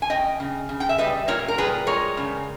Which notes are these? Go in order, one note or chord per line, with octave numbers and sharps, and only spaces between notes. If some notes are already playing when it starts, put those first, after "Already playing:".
G#5
C#3 D#5 G5
C#3
C#3
G5
E5
G3 B4 D#5
A#2 A#4 C#5
A#4
G3 G#4 B4
G#3 A#4 C#5
C#3